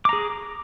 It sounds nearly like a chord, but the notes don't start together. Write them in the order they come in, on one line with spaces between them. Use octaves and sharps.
D6 A#5 G#4